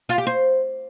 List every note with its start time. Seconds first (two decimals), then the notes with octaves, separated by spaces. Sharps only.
0.09 F4
0.18 G4
0.27 C5